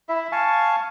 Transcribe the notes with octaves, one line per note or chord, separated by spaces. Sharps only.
E4 E5
F5 G#5 A5 C#6